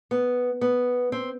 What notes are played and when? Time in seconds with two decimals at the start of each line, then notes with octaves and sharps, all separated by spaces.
0.11 B3
0.61 B3
1.12 C4